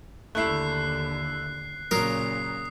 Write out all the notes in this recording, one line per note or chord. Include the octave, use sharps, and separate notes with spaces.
D#2 D3 A3 E4 F#6 C7
A#2 C#3 F#3 A#4 D#6 C7